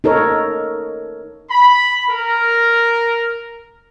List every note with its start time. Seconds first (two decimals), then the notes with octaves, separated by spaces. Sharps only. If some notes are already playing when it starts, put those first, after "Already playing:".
0.04 D#4 A4 A#4 C#5
1.50 B5
2.09 A#4